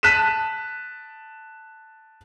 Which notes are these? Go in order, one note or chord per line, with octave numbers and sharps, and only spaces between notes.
A5 F#6 B6 D#7 E7